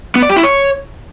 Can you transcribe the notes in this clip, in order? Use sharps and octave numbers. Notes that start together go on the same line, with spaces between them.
B3
D5
G4
E4
C#5